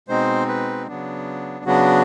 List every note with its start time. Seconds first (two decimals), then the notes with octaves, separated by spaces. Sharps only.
0.08 B2 G#3 C4 D#4 C5
0.48 B4
0.87 C#3 F#3 B3 D4
1.65 C#3 F#3 B3 D4 F#4